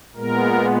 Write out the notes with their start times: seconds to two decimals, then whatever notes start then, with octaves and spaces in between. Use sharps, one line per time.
0.15 A#2 G#3 B3 A#4